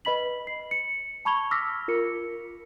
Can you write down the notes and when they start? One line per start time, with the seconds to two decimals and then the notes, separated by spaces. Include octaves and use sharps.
0.05 B4 D#5 B5 B6 F#7
0.47 C7
0.71 C#7
1.25 A5 B5 C#6 G#6 F7 G7
1.51 D6 E6 F6 A#6 B6
1.88 F4 A#4 C#7